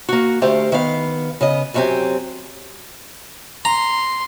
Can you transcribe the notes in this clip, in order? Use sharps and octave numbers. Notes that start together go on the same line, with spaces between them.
A#3 F#4
D2 A3 G4 C5 F5
D#3 B3 F5
C#3 B3 D#5
F#2 F#3 G#3 C4 G4 G#5
A#5 C6